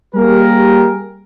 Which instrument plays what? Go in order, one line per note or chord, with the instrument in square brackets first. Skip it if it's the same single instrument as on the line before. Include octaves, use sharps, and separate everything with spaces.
[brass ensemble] G3 A#3 G4 G#4 A#4